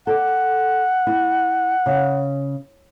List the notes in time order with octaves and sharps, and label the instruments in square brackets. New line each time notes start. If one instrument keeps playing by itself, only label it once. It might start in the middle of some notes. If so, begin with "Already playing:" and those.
[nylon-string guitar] A4 D5 [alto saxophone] F#5
[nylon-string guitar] E4
C#3